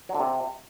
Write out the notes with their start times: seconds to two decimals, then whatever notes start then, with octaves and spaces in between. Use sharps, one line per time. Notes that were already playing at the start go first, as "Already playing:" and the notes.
0.09 F#3
0.14 D3
0.20 C3